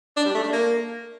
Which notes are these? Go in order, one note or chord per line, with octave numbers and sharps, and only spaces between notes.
D4
G3
A3
D4
A#3